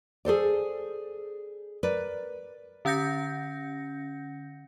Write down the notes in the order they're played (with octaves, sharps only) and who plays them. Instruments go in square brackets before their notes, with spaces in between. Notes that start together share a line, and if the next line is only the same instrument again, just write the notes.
[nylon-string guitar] G#4 A4 C5 D5
A#4 B4 D5
[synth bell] D3 C#4 F#5 G6 A#6 C#7